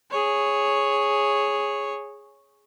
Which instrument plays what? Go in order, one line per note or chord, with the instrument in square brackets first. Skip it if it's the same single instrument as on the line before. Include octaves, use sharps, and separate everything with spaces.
[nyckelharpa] G#4 C#5